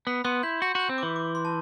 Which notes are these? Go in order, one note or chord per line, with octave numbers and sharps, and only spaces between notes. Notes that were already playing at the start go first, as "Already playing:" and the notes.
B3 B5
B3 C6
E4 G6
F#4 G6
F#4 G6
C4
D6
E3
D6
C6
A5